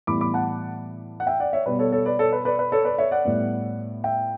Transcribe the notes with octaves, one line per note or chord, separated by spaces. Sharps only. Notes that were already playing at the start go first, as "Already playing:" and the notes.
A2 E3 G3 B3 B5 D6
B5 D6
F#5 A5
F#5
E5 G5
D5 F#5
C#5 E5
B2 G3 B3 B4 D5
A4 C#5
A4 C#5
B4 D5
A4 C#5
B4
B4 D5
B4
A4 C#5
B4 D5
C#5 E5
D5 F#5
A2 G3 B3
E5 G5